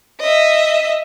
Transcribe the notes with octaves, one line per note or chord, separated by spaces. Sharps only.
D#5 E5